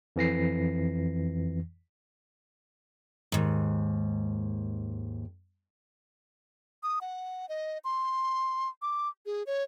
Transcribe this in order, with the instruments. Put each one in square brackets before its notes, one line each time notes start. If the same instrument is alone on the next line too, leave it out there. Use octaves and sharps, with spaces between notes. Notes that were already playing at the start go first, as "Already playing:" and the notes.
[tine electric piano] F2 E3 A#6 C7
[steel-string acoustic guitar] D#2 G#2
[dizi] D#6
F#5
D#5
C6
D6
G#4
C#5